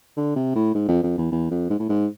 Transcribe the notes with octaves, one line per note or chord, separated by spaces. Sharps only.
D3
C3
A2
G#2
F2
F2
E2
E2
F2
G#2
A2
G#2